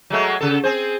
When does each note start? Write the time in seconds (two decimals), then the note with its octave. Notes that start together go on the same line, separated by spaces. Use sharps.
0.10 F#3 G#3 A3
0.41 C#3 A4
0.64 C4 G#4 C5